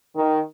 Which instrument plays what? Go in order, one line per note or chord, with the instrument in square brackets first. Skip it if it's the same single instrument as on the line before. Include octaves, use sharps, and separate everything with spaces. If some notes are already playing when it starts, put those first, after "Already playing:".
[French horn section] D#3